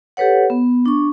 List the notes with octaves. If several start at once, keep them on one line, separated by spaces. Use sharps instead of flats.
G4 A4 B4 C#5 F#5
B3
D4 C#6